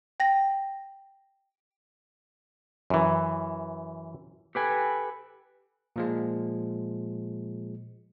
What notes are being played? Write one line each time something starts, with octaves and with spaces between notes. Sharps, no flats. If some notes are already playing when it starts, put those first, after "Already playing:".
G5 A#6
F#2 E3
G4 A4 B4 G5 G#5
A#2 F3 G#3